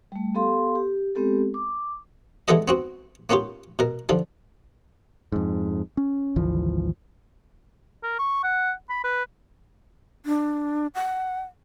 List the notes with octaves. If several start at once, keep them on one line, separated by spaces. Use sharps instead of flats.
G3 A3
B3 G4 A4 F5 C6
G4
G#3 B3 C4 G4 A4
D6
E3 G3 G#3 B3 A4 D#5
B3 C4 F#4
A#3 B3 C#4 F4 G4
B2 A#4
D3 F3 G3
F2 G#2
C#4
G#1 D2 E3 F3
A#4
C#6
F#5
B5
B4
D4
F#5